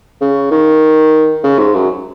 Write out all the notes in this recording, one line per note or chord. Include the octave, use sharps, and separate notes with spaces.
C#3
D#3
C#3
G#2
F#2